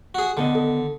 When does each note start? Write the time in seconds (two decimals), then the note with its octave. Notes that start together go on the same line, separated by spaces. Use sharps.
0.15 F#4 G#4
0.37 D3 D#3 B3 D#5
0.55 A4